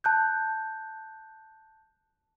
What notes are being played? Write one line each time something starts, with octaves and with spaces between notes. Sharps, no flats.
A5 F#6 G6